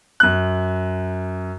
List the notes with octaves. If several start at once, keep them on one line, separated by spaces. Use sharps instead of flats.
F#2 F#6